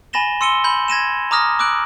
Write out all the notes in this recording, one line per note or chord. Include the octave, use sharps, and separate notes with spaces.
G#5 B5 A6 A#6 E7 G7
C6 E6 C#7 D#7 G7
B5 G6 F#7
G#6 A#6 D#7 E7
A#5 D6 D#6 F6 A#6
D6 E6 F#6 D7 F#7